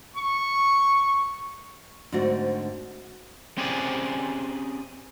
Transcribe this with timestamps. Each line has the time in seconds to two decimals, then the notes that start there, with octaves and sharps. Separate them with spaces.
0.16 C#6
2.12 G#2 D3 A3 C4 D4 F#4
3.58 C4 C#4 G4 G#4 C5 D5